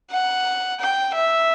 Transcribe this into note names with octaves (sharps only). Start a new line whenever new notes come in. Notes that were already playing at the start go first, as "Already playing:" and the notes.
F#5
G5
E5